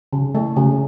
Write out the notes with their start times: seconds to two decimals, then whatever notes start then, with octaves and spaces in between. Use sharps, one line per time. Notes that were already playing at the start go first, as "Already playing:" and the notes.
0.13 C#3
0.35 A3
0.56 C#3